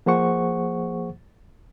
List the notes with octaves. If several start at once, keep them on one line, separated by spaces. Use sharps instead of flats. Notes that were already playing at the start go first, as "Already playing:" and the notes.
F3 A#3 G#4 C5 F#5 C#6